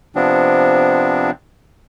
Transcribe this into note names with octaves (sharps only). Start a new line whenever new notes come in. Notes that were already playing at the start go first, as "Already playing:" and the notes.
C3 F3 B3 C4 D4